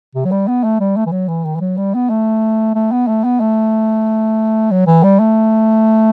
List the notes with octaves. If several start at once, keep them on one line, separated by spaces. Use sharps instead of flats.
C3
F#3
G3
B3
A3
G3
A3
E3
F#3
E3
D#3
E3
F#3
G3
B3
A3
A3
B3
A3
B3
A3
F#3
E3
G3
A3